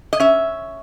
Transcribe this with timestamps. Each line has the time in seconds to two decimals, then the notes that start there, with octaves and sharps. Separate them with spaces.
0.13 D#5
0.20 C#4 E5